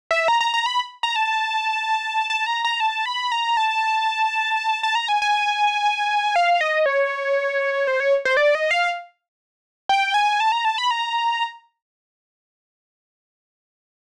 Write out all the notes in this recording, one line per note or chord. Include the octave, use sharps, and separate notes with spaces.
E5
A#5
A#5
A#5
B5
A#5
A5
A5
A#5
A#5
A5
B5
A#5
A5
A5
A#5
G#5
G#5
F5
D#5
C#5
C5
C#5
C5
D5
D#5
F5
G5
G#5
A5
A#5
A5
B5
A#5